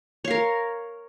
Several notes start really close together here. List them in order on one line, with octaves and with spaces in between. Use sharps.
C#5 F5 A#4